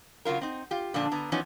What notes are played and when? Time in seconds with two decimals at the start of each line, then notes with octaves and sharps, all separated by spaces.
0.25 C#3 F#3 F4 A#4
0.41 C4 D#4
0.71 F4 G4
0.94 A#2 D3 F3 D4 A5
1.12 D3 B3 A#5
1.32 E3 F3 B3 C#4 D#4